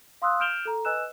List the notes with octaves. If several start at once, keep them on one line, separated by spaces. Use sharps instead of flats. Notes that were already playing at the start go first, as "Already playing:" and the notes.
F5 C6 D#6 E6 F#6
F6 G6 D7 E7 F7 G7
A4 A#5
B4 D#5 G#5 E6 F#6 E7